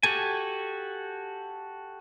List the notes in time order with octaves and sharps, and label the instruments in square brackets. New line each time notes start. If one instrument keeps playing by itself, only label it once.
[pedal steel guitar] F#4 G4 A4 G#5